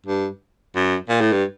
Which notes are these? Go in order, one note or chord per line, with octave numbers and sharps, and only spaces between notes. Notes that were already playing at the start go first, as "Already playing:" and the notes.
G2
F#2
A#2
A2
G2